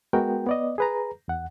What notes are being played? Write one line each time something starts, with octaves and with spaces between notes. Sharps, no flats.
G#3 B3 F#4 A#4 G5
B3 D5 D#5
G#4 B4 A#5
E2 F#5